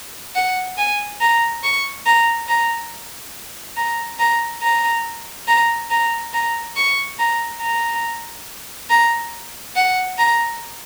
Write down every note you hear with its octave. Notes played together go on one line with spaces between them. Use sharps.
F#5
G#5
A#5
C#6
A#5
A#5
A#5
A#5
A#5
A#5
A#5
A#5
C#6
A#5
A#5
A#5
F#5
A#5